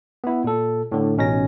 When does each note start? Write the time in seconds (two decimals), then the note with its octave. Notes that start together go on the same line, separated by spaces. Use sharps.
0.24 B3 E4
0.44 A#2 A4
0.92 A2 D3
1.17 A1 B2 C#4 D#4 A#6